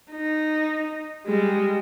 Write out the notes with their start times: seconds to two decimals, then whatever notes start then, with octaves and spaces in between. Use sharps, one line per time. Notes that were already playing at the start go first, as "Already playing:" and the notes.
0.11 D#4
1.26 G3 G#3